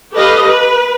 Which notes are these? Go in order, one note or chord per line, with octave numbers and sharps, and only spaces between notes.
G4 A4 B4 D#5 F5
B4